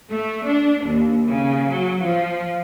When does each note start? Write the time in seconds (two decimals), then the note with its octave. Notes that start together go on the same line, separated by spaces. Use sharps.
0.12 A3
0.45 D4
0.87 D#2
1.27 C#3
1.69 F#3
2.00 F3